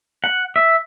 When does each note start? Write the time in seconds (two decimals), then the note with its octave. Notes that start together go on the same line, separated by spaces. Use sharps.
0.24 F#5
0.56 E5